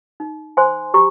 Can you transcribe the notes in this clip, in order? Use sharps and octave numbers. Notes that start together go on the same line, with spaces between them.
D#4
C5 G#5 C6
G4 A#5 C#6